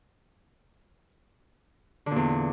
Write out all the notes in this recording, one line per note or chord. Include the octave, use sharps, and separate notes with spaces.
E2 A#2 D3